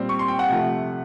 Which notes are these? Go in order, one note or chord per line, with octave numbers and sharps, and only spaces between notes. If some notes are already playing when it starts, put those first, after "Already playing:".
Already playing: A#2 G3 C4
C#6
C6
G5
F#5
C3 F3 A3